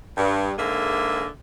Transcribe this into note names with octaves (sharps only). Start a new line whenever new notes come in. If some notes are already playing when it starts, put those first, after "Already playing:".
G2
G#2 D3 A#3 G#4 E5